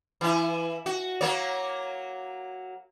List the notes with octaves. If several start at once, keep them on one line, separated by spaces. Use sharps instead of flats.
E3 E4
F#4
F#3 A#3 C#5